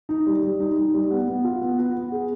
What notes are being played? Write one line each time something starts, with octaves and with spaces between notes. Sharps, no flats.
D#4
G3
G3
D#4
D#4
G3
B3
B3
F4
B3
B3
B3
G#4